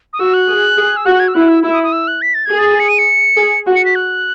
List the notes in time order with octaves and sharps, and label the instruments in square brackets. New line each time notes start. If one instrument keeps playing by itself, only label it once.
[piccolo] D#6
[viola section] F#4 [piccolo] E6
[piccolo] F#6
[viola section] G#4
G#4
[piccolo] E6
[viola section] F#4 [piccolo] F#6
[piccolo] G#6
E6
[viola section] E4 [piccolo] F#6
[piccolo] E6
[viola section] E4 [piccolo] E6
[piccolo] D#6
D#6
E6
F#6
B6
A6
[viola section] G#4 [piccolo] G#6
[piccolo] A6
C#7
D#7
C#7
[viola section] G#4
F#4
[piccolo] C#7
B6
F#6